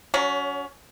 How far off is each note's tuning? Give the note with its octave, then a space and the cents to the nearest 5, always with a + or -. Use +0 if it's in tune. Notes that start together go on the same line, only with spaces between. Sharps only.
F#3 +0 C#4 +30